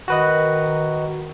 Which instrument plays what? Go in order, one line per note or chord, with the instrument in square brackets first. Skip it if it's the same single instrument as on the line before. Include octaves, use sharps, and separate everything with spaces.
[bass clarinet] D#3 [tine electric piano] F#4 B4 D#5